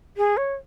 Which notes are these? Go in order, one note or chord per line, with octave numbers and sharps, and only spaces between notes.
G#4
C#5